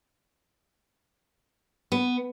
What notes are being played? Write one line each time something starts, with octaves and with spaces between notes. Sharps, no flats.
B3